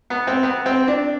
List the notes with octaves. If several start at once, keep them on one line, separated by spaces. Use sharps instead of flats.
B3
C4
B3
C4
D4